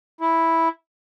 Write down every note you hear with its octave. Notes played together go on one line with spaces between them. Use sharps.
E4